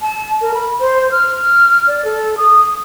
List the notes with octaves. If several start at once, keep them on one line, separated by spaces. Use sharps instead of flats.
A5
A#4
B5
C5
F6
D5
A4
D#6